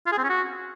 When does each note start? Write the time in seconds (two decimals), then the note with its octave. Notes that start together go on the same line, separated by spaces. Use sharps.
0.06 F4
0.12 G#4
0.18 C4
0.24 C#4
0.30 F#4